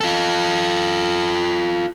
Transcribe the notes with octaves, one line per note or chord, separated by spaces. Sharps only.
F4 A4